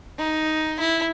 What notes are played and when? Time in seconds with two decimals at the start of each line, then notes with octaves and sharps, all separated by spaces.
0.18 D#4
0.80 E4